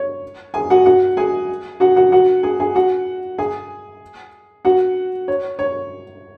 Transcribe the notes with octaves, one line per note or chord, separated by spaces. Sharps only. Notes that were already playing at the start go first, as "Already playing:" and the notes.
Already playing: C#5
G#4 G#5
F#4 F#5
F#4 F#5
G#4 G#5
F#4 F#5
F#4 F#5
F#4 F#5
G#4 G#5
G#4 G#5
F#4 F#5
G#4 G#5
F#4 F#5
C#5
C#5